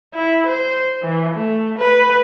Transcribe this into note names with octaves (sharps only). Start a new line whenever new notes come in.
E4
C5
E3
A3
B4